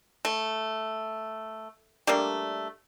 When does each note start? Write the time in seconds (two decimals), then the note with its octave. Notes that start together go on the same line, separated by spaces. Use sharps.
0.25 A3
2.07 G3 A3 A#3 D4